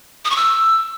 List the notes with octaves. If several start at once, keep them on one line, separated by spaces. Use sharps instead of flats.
D#6
C#6
E6